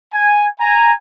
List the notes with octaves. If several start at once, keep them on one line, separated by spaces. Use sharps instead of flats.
G#5
G#5 A#5